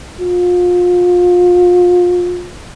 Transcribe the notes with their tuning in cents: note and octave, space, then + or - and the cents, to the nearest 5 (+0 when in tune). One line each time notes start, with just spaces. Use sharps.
F4 +30